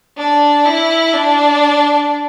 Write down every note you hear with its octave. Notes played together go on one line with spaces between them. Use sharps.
D4
E4
D4